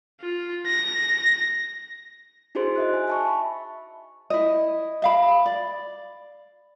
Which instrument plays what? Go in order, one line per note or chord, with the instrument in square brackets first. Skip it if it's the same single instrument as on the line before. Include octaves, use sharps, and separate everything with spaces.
[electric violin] F4
A#6
[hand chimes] D#4 E4 F#4 G#4 C5 C6
D#5 E5 F#6
G#5
E5 A5 C#6
B5
[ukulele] E4 D#5
D#5 F5 B5
D5